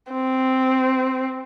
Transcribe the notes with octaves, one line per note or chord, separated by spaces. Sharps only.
C4